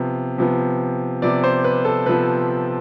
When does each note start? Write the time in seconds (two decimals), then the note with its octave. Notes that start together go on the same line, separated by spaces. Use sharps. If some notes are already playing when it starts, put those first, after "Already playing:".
Already playing: C3 F3 B3
0.38 C3 F3 B3
1.22 C3 F3 B3 D5
1.44 C5
1.64 B4
1.85 A4
2.06 C3 F3 B3 B4